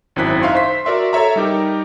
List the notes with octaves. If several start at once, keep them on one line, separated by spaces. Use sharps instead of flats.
G#1 F#2 C4 E4 F#6 B6
D#4 E5 F5 C6 C#6
C5 C6 B6
F#4 A#4 D5 E5 C6
A4 C#5 E5 A#5
G3 D#4 G4 A#4